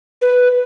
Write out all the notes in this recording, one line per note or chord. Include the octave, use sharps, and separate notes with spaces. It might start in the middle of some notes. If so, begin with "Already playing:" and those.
B4